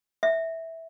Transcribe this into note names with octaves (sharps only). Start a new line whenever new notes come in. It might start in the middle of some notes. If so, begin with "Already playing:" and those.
E5